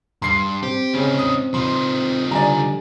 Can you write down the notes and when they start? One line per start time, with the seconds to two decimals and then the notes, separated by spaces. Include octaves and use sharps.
0.22 G2 C6 C7
0.63 C4 G4
0.94 C#3 C#4 D#4
1.19 D#6
1.54 F3 D#4 C6
2.31 D3 G3 D5 G#5 A#5